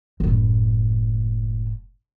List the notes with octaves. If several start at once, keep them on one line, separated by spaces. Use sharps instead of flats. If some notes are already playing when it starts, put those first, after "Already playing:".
F#1 A2